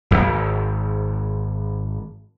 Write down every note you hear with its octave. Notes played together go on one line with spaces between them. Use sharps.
D#1 G#1